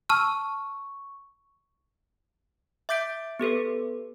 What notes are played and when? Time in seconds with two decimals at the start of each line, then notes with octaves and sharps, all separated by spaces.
0.09 A5 C#6 E6 F6
2.89 E5 D6 G6 B6 D7
3.39 B3 G4 A4 B4